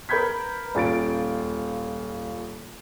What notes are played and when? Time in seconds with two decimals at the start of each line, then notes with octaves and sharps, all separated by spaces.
0.09 A#4 B4 B5 G6 G#6 B6
0.75 D#1 F4 A6 D7